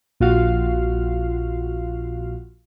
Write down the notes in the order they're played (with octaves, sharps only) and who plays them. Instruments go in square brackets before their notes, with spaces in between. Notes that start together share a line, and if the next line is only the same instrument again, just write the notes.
[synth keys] A#1 F4 F#4 F5